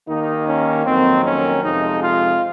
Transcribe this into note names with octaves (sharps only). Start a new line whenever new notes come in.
D#2 D#3 A#3 D#4
C#4
F2 D#3 F#3 A#3 C4
C#4
F2 C3 F3 G#3 D#4
F4